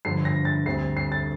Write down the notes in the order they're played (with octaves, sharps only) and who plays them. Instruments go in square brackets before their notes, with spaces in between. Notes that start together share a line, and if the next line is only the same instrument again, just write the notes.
[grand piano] G2 D3 F3 C7
A#6
A6
D2 D3 G3 C4 C7
C7
A6